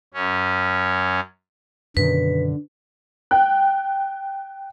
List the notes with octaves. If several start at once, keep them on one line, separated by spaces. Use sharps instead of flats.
F#2 C#4
F#2 B2 D3 D#3 B4
G5 F#6